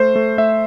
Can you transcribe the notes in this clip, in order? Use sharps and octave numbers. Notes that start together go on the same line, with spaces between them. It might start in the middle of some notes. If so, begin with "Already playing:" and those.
Already playing: A3 C5
A3
A3 E5